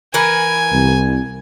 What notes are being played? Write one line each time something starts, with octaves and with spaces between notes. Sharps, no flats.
E3 A#4 B4 G#5
C2